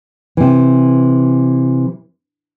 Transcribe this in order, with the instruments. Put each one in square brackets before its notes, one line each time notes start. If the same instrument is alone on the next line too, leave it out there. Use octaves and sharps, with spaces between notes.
[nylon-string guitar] C3 E3